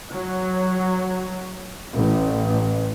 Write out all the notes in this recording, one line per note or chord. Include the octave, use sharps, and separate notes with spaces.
F#3
A1